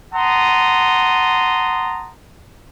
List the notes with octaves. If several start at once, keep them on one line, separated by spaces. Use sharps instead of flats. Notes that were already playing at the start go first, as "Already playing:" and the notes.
F#5 A5 A#5 C6 D#6